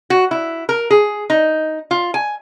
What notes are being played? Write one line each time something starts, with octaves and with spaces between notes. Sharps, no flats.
F#4
E4
A#4
G#4
D#4
F4
G#5